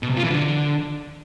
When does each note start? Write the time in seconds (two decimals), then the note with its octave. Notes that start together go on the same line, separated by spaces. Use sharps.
0.03 B2
0.10 C3
0.17 F4
0.23 E3
0.30 D3